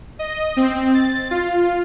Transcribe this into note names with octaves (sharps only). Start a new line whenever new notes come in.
D#5
C4
A6
F4